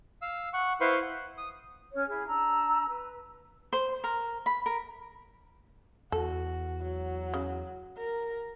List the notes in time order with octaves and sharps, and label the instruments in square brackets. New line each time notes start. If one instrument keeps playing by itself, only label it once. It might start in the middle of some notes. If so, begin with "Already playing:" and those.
[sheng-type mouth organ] F5 E6
F#5 C#6
E4 B4 C5 F5 C6 C#6
F#5
D#6
[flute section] C#4 C#5 F6
E4 G#4
D4 A#5 E6
B4
[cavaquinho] C5
A#4
B5
A#4
[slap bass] E2 [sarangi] F#4 [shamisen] A4
[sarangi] F#3
[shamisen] C#3
[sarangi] A#4